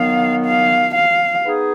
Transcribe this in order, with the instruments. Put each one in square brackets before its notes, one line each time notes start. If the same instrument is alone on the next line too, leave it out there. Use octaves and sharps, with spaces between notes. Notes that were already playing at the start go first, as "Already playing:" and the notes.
Already playing: [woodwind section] D#3 F#3 B3 [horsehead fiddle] F5
[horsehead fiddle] F5
F5
[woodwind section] B3 D#4 G#4